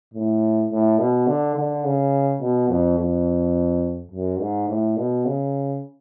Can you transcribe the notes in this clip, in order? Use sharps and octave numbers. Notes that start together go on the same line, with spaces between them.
A2
A2
B2
D3
D3
C#3
B2
F2
F2
F#2
G#2
A2
B2
C#3